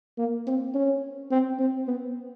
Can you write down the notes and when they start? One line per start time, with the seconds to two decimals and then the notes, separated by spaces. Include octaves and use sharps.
0.18 A#3
0.47 C4
0.74 C#4
1.31 C4
1.59 C4
1.87 B3